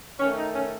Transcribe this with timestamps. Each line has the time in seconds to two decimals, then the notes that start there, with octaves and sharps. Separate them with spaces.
0.20 D#3 A3 C#4
0.37 D#4
0.54 C#4